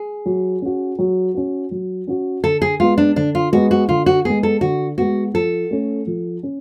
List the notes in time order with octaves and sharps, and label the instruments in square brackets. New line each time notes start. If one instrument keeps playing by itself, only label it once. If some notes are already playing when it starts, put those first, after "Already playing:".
Already playing: [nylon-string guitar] G#4
[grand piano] F#3
C#4 F#4
F#3
C#4 F#4
F#3
C#4 F#4
[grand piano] D3 [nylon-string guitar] A4
[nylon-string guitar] G#4
[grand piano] G#3 B3 [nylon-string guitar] F4
[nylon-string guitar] D4
[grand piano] D3 [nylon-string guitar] D4
[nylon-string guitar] F4
[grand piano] G#3 B3 [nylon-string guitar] F#4
[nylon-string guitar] F#4
[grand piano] D3 [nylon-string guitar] F4
[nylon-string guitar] F#4
[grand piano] G#3 B3 [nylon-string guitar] G#4
[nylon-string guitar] A4
[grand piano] D3 [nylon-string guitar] F#4
[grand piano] G#3 B3 [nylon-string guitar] F#4
[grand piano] F3 [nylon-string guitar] A4
[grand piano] A3 C#4
F3
C#4